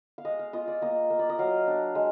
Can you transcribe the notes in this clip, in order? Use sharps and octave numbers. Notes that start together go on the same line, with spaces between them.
F5
G#3 D#5
F5
F4 D#5
D5
A#3 D#5
A#3
D5
D#5
F#3 F5
D4
G#3